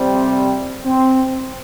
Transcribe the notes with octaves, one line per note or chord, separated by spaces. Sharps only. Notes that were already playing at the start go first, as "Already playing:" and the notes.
Already playing: F2 C3 G3 C4
C4